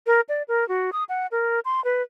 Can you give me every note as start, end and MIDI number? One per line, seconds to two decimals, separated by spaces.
0.07 0.21 70
0.29 0.43 74
0.48 0.67 70
0.69 0.90 66
0.93 1.04 87
1.09 1.27 78
1.32 1.60 70
1.65 1.83 84
1.84 2.02 71